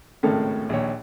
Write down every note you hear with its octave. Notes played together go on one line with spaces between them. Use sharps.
G#1 A2 C#3 A4 A#4
A#1 D#2 C#5